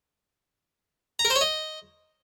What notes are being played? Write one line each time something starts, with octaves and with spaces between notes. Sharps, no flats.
A#5
A#4
C5
C#5
D#5